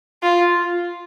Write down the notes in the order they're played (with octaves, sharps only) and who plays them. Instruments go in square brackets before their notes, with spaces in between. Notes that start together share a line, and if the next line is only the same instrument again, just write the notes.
[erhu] F4